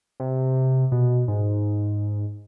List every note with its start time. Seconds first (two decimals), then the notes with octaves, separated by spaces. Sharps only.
0.20 C3
0.92 B2
1.28 G#2